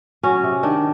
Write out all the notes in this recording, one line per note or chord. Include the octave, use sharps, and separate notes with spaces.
F#3 C#4
C3
D#3 D4